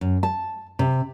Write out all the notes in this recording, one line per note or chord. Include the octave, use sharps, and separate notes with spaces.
F#2
A5
C3